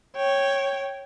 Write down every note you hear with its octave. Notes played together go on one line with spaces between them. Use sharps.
C#5 G5